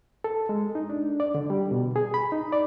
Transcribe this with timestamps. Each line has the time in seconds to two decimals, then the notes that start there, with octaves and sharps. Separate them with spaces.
0.24 A4
0.49 G#3
0.75 D#4
0.90 D4
1.20 D5
1.35 D3
1.50 G3
1.71 B2
1.96 G#4
2.14 B5
2.32 D#4
2.52 D5